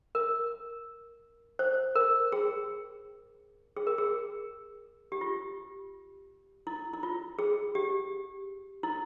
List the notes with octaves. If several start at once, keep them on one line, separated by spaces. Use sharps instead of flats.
A#4
C5
A#4
G#4
G#4
A#4
G#4
G4
F4
E4
E4
F4
G#4
G4
E4